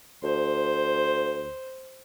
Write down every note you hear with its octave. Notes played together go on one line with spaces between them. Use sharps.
D2 C5